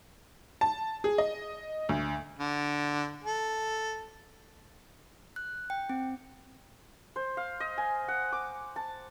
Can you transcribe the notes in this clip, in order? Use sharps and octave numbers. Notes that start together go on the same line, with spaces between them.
A5
G#4
D#5
D2
D3
A4
F#6
G5
C4
C5
F5
D#5
G#5
F#5
D6
A5